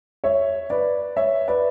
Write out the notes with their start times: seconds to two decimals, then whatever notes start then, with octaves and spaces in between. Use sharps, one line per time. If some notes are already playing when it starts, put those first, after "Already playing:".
0.24 C#5 E5
0.70 B4 D5
1.17 C#5 E5
1.48 B4 D5